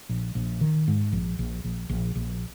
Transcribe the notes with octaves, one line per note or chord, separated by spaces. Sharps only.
A#1
A#1
D#3
G#2
A#1
A#1
A#1
A#1
A#1